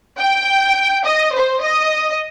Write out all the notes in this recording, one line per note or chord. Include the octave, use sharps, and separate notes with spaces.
G5
D#5
C5
D#5